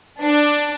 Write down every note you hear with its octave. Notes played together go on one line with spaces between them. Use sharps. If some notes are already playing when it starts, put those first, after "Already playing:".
D4